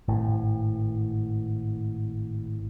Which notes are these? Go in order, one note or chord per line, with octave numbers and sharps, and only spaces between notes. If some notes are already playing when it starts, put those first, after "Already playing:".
G#1 A2